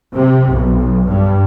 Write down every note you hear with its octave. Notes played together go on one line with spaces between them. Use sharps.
C3
B1
G2